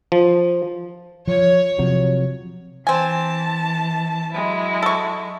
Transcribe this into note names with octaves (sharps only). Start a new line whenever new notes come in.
F3
F3 C#5
C3 F3 F#3
E3 C4 G#5 A5
F#3 G#3 E4
A4 C#6